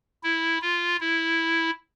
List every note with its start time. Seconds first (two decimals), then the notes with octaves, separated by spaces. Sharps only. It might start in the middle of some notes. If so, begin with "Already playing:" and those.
0.23 E4
0.62 F4
1.00 E4